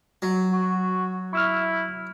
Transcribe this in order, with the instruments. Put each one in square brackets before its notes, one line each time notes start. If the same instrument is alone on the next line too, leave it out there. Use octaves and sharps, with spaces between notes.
[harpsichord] F#3
[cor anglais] F#4
[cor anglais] E4 [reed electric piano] C#6 E6 F6